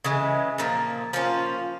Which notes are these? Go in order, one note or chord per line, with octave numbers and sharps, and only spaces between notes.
C#3 E3 G#3
A#2 F3 A#3
F3 A#3 C#4 F4